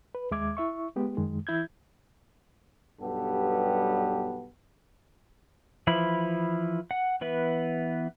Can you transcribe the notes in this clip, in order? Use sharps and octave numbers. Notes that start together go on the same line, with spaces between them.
B4
D#2 G#3 E5 D6 G#6
E4 E5 C#6
G#3 B3 G4
F#2 D#3 G#3
E3 E4 G6 G#6
B1 G2 G3 B3 G4 A4
E3 F3 E4 B5
F#5
E3 B3 B4 E5